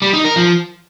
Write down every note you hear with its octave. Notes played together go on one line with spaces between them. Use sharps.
G3
D#4
A#4
F3